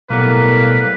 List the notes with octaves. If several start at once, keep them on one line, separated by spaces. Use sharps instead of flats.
B1 A2 G3 A#3 B3 B4